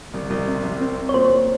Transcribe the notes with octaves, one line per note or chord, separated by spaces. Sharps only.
C2
C2
C3
C2
C4
C4
C#5
A#2 C5
A#2